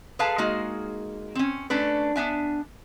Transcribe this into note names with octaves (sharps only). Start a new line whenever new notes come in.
G#4 A4 B4 F5 A5 A#5
G#3 A#3 D#4 F#4 G#4
C4 C#4
A3 C#4 D4 B4
B3 D4 E5 G#5